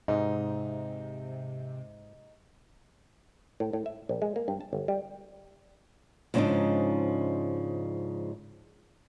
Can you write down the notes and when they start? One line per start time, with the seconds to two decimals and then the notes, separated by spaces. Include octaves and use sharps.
0.08 G#2 C3 D#4
3.60 A2
3.73 A2
3.86 E5
4.09 A#1
4.22 G#3
4.36 A#3
4.48 G2
4.61 A5
4.73 G1
4.88 G3
6.34 G#2 C#3 F3 G3 D4 D#4